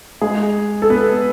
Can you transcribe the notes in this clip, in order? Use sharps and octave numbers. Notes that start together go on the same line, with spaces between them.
G#3 G#4
A4
B3 B4